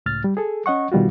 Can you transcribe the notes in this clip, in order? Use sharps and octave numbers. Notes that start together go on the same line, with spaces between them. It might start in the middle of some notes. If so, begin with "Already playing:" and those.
C#2 A2 F6 A6
G3
G#4 A4
C#4 D#5 F#5 C#6
B2 D#3 G3 F4 F#4